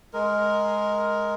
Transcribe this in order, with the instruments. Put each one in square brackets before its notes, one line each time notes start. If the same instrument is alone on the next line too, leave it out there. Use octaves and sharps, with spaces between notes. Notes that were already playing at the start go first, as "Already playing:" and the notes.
[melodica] G#3 A#4